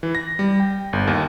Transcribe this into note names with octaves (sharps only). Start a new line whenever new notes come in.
E3
A#6
G3
G5
G1
D#2